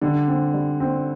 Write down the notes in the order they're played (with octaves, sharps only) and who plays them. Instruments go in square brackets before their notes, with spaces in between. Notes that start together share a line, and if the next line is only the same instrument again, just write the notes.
[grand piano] D3 [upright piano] G3
[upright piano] C4
G3
C4